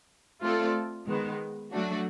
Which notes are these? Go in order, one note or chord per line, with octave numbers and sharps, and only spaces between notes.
A3 C4 F4 A4 D5
D#3 G#3 B3
F#3 A3 D4 F#4